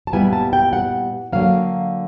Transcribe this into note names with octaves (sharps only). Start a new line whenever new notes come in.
A5
A#2 G3 B3 E4 G#5
A5
G5
F#5
D3 F#3 A#3 F5